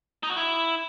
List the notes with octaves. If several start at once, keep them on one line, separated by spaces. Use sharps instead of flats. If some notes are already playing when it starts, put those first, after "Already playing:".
D#4
F#4
E4